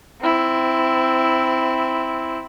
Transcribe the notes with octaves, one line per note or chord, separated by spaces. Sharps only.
C4 E4